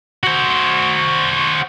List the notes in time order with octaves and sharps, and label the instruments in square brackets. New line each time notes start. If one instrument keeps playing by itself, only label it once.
[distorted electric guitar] F#4 C5